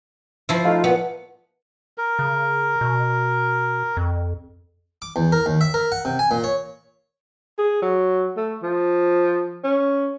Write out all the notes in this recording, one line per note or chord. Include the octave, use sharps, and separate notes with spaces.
F3 E4
A3 D#4 F4
A#2 B3
A#4
C#3
B2
F2
D6
E2
A#4
D#2
E5
A#4
F#5
C3
G#5
A#2
C#5
G#4
F#3
A3
F3
C#4